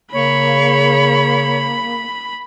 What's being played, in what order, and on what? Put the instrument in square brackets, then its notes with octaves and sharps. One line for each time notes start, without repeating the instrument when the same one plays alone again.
[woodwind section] C#3 [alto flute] A#3 [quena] C#5 [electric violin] B5